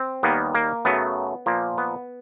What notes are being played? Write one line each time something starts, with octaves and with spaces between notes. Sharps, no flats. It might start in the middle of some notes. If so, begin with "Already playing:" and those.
Already playing: C4
D#2 D#3 G3 A#3 B3
A#3
F#2 C#3 F#3 A3 B3
A#2 F3 A#3
B3